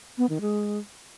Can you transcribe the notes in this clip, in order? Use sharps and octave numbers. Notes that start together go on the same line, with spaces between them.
B3
D#3
G#3